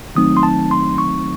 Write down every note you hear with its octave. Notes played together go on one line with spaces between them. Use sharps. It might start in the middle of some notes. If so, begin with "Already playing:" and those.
D#3 F#3 A3 C4 D#4 D#6
C6
A5
C6
C#6